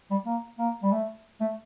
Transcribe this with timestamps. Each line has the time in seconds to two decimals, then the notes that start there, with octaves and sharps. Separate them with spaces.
0.10 G3
0.25 A#3
0.58 A#3
0.83 G3
0.92 A3
1.41 A3